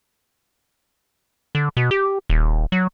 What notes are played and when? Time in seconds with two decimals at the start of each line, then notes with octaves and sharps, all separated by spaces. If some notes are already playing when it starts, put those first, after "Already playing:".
1.55 D3
1.77 B2
1.91 G4
2.30 D#1
2.72 F#3